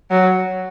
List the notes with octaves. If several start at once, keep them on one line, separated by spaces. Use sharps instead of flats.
F#3